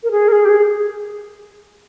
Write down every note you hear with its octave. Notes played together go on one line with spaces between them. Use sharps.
A#4
G#4
A#4
G#4
G4
G#4